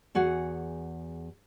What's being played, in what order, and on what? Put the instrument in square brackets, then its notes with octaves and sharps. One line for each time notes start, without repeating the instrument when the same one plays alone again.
[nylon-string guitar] E2 F#4 G#4 F#5